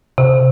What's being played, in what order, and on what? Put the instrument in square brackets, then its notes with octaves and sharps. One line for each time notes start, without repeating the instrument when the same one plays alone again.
[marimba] C3